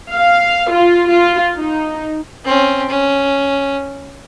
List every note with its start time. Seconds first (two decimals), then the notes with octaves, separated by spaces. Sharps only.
0.14 F5
0.72 F4
1.11 F4
1.57 D#4
2.45 C4 C#4
2.89 C#4